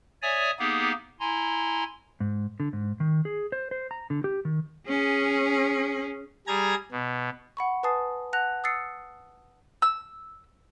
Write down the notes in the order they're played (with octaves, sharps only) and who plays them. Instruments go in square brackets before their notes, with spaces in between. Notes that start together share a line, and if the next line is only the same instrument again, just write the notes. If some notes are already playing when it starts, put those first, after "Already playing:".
[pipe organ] C#5 D5 E5 G#5 D#6
A#3 B3 D#4 G4 G#4
E4 G#5 A#5 C6
[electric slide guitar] G#2
D3
G#2
D#3
G#4
C5
C5
A#5
D3
G4
D#3
[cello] C#4 G#4
[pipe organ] G3 G#4 A#5 G#6 A#6
B2
[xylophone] F#5 B5 C#6
B4 G#5 A5 D#6 A6 C7
F#5 A5 F#6 A#6 F7
D#6 E6 A6 C7 C#7
[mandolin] E6